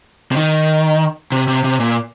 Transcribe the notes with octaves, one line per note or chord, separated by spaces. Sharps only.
C3
D#3
C3
C3
C3
A#2